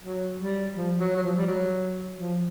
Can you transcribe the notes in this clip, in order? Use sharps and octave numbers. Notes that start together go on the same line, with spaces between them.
F#3
G3
F3
F#3
F#3
F3
G3
F#3
F3